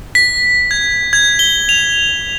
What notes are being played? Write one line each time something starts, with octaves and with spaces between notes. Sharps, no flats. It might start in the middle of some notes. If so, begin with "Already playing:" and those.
B6
G#6
G#6
G7
F7